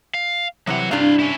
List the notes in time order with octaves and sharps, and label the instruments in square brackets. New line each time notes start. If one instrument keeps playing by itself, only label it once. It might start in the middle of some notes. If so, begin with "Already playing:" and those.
[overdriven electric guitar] F5
[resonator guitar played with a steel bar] C3 E3 G3 [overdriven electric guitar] F#3 F#5
[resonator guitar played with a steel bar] G2 C3 D4 [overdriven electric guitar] E4 F5
[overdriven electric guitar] C#4 E4